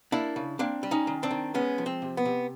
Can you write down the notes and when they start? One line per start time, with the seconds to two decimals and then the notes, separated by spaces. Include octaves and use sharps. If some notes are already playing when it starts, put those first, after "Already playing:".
0.12 A#3 D4 E4
0.36 C#3
0.59 A#3 C4 D4
0.83 G3
0.91 C#4 D#4
1.07 D#3
1.23 C4 D4
1.31 D#3
1.54 G#3 B3 C#4
1.78 F3
1.86 C4
2.02 C3
2.17 B3
2.25 C3